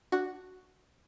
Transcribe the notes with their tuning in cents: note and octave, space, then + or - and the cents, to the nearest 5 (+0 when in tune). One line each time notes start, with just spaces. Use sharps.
D4 +0 F#4 +0